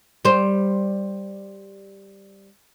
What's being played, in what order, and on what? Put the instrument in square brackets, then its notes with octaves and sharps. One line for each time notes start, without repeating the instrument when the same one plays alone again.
[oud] G3 C5